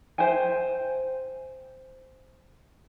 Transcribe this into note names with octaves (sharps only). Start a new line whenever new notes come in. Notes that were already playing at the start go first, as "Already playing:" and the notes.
C5 E5 G5 G#5